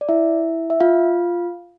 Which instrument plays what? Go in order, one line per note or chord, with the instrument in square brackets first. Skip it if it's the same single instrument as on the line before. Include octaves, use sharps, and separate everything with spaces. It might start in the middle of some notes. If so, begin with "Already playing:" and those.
[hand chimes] D5
E4 E5
E5
F4 F5